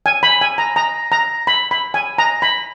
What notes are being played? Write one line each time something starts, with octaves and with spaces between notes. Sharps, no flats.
G#5
B5
G#5
A#5
A#5
A#5
B5
B5
G#5
A#5
B5